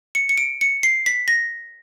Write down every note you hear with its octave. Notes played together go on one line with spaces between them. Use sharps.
C#7
C#7
D7
C#7
C7
B6
A#6